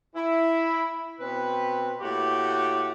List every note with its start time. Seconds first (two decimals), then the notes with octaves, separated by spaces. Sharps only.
0.15 E4
1.20 B2 C4 B4
2.01 A2 A#3 F#4 G4